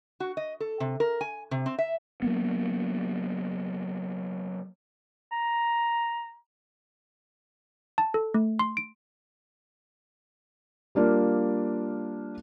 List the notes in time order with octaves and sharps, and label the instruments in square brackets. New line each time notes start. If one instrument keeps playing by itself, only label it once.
[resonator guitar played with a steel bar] F#4
D#5
A4
C3
A#4
G#5
C3
C4
E5
[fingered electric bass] F#3 A#3 B3
[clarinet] A#5
[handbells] A5
A4
A3
C6
D7
[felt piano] G3 A#3 D4 F4